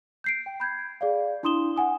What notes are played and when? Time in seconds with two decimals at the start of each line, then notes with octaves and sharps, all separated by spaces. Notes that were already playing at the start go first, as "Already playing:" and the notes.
0.24 G6 C7 D7
0.46 G5
0.60 B5 G6 G#6
1.01 G#4 D5 F5
1.43 D4 E4 C6 D#6 E7 G7
1.76 F#5 G#5 D#6